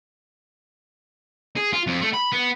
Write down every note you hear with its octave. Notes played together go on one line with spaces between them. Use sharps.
G#4
F4
F2
A3
B5
B3